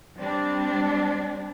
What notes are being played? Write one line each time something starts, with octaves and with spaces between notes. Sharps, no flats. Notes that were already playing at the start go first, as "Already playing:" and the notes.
G3 C4 D4